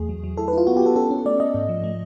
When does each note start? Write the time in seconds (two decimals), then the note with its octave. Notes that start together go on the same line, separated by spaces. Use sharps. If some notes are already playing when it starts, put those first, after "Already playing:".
Already playing: E2 A3 G#4
0.09 F#3
0.24 F#3
0.37 E4 A4
0.48 B4
0.53 E4 F4
0.67 B3 F#4
0.77 G4
0.82 B3 A4
0.96 C#4 A4
1.11 C#4
1.25 A3 D5
1.40 A3 D#5
1.54 G#2
1.69 F3
1.84 A3